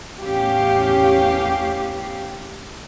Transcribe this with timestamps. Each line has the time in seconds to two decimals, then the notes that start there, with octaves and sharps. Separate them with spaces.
0.21 E2 A2 C#4 G4 F5